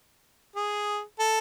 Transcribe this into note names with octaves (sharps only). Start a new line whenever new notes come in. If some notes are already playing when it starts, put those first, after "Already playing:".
G#4
A4